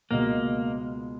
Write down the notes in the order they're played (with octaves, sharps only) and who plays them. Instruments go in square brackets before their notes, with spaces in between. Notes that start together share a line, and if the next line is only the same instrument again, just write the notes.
[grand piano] C#2 B2 G#3 [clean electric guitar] A#3